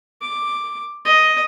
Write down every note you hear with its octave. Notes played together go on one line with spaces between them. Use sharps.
D6
D#5